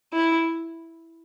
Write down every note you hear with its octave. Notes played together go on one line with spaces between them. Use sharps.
E4